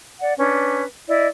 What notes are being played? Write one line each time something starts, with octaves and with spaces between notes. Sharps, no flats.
D5 F#5
C#4 D4 B4
E4 D5 D#5